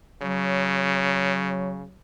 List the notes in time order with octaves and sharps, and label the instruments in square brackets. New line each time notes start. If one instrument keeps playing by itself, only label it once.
[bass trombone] C#3 [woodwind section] F#3